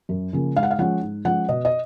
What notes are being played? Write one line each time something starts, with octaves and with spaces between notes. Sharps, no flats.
F#2
C#3 F3 A#3 C#4
G#2 F5
F#5
F5
F3 G#3 C#4 F#5
G#2
F3 G#3 C#4 F#5
B2 D#5
D#5